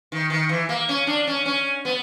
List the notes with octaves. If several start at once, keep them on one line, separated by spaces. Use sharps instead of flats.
D#3
D#3
E3
A#3
C#4
D4
C#4
C#4
B3